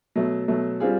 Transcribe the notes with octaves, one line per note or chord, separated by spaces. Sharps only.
B2 F#3 A3
B2 F#3 A3
G3 C4 F4 G#4